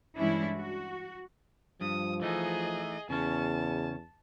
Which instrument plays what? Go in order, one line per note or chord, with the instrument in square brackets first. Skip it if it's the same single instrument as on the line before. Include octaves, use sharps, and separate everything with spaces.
[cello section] G2 E3 G#3 C#4 D4 E4
F#4
[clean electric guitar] G2 [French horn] F3 [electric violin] D#6
[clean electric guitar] E3 A3 D#4 [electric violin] G#4 D#5
[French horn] E2 [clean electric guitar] C#3 C#4 [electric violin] A5